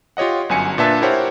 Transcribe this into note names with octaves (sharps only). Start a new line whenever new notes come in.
F4 G4 C#5 D#5 F#5
G1 F#2 G#5 C#7
A#2 D4 B4 E5 A5 A6
E4 G4 A#4 C5 C#5 F#5